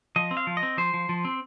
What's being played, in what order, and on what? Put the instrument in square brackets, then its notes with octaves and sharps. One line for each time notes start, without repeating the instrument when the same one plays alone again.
[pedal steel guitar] F3 D#5
C4
F5
F3
D#5
C4
F3 C5
F3
F3
C4